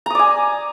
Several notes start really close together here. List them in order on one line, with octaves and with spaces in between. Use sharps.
A#5 D#6 D5 G#5